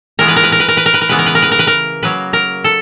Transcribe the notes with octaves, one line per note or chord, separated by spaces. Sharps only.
A2 E3 G#3 B3 A#4
B4
A#4
B4
A#4
B4
A#4
B4
A#4
B4
A#4
C#3 E3 G#3 B3 B4
A#4
B4
A#4
B4
A#4
B4
A#4
C#3 F#3 A#3 B4
A#4
A4